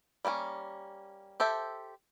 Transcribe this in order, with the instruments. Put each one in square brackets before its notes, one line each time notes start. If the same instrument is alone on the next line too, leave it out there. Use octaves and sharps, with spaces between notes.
[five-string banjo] G3 A#3 C4 C#4
G4 A4 C5 E5